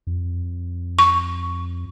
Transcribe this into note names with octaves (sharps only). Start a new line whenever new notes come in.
F2
C#6